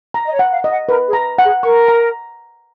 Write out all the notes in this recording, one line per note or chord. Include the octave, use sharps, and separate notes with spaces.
A#5
D#5
C#5
F#5
F5
D#5
F#5
A#4 B4
G#4
A#5
F#5
G#4
A#4 C#6
A#5